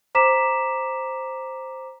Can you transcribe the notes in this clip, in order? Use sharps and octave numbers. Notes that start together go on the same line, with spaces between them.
C5 A#5 D6 B6 E7